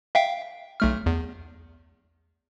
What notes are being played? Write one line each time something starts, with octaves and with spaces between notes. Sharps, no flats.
E5 F5 G5
B1 A3 F6
E2